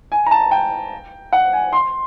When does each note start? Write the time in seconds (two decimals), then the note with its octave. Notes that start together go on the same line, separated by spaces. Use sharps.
0.12 G#5
0.26 A#5
0.31 A5
0.51 G5
1.33 F#5
1.53 G#5
1.73 C6